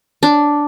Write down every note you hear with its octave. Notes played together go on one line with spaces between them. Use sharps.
D4